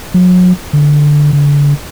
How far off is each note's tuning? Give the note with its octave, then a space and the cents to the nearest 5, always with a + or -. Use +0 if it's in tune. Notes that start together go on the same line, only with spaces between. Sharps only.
F#3 -35
D3 +0
D3 -35